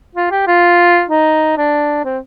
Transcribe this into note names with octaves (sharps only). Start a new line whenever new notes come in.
F4
G4
F4
D#4
D4
C4